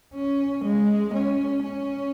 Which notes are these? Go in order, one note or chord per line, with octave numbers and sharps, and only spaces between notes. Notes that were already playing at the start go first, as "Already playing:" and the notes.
C#4
G#3
C#4
C#4